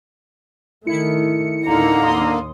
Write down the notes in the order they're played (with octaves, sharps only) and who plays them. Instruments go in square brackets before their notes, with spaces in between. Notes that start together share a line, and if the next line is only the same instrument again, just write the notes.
[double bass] D#3 A3 [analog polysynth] E4 C#7
[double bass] D2 A2 [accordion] D3 A#3 [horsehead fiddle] D#4 A#5
[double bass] D#2 [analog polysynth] C6 D#6